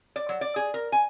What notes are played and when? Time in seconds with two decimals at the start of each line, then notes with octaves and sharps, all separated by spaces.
0.16 D5
0.29 F#3
0.41 D5
0.56 G#4
0.74 A#4
0.92 G#5